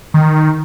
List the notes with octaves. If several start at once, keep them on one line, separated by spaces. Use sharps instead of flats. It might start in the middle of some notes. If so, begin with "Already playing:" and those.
D#3